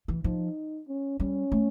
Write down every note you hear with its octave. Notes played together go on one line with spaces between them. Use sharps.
E3
F3 D#4
C#4
G3 C#4
A3